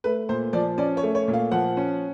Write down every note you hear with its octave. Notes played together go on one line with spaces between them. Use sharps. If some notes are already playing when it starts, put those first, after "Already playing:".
A3 B4
A#2 C5
F3 D5
C#4 D5
C#5
A3
C#5
A#2
F5
F3 F#5
C#4